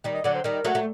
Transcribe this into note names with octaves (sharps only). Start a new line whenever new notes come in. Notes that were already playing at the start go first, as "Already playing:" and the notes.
D#3 G3
D#5
D3 F#3 D5
C5
D#3 G3 A#4
F#3 A3
A3